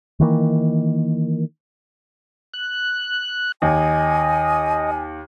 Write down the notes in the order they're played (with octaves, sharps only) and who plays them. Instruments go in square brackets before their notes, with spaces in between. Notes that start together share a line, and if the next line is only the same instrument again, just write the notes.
[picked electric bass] D#3 E3 A#3
[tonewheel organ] F#6
[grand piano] D#2 [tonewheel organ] D#5 [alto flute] G#5